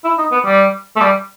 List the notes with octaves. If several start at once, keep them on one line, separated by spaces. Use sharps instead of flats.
E4
D#4
B3
G3
A3
G3